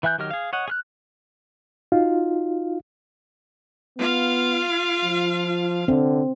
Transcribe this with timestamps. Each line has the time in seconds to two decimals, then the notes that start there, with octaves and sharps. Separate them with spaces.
0.03 E3 E5 G#5 F#6 G6
0.18 D#3 F#3 G4 D#5 F6
0.30 G#4 F5
0.53 C#5 D#5 F#5
0.68 G#4 F6 F#6
1.92 D#4 F4 F#4 F5
3.98 B3 F4 F5
5.04 F3
5.88 D3 C4